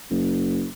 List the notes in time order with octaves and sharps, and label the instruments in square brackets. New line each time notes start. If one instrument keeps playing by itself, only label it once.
[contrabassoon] F#1